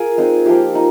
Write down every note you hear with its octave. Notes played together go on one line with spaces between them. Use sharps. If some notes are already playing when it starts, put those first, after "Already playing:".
Already playing: F4 G#4 A#4
G#3 C4 D#4
F3 A#3 F4 G4
D#4